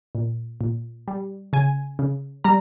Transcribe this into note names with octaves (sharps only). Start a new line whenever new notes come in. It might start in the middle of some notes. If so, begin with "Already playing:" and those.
A#2
A#2
G3
C#3 G#5
C#3
G3 A#5